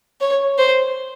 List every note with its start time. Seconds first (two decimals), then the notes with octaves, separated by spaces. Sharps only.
0.21 C#5
0.58 C5